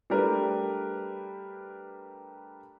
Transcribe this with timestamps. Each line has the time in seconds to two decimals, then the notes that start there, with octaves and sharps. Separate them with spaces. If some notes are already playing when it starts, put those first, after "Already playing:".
0.10 G3 A3 D4 G4 A#4 B4